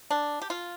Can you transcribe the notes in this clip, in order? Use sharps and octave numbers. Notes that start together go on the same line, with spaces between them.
D4
G4
F4